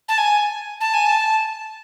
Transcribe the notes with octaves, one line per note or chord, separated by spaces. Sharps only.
A5
G#5
A5
G#5
A5